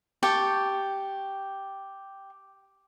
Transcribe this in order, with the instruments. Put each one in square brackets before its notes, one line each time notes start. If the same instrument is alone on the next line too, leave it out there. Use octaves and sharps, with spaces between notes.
[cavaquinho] G4 G5 A5 C#6